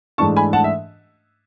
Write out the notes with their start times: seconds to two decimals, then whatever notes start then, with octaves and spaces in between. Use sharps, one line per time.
0.18 G#2 E3 A3 D4 A5 C#6
0.37 G#5 B5
0.53 F#5 A5
0.64 E5